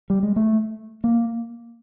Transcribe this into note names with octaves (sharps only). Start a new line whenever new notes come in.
G3
G#3
A3
A#3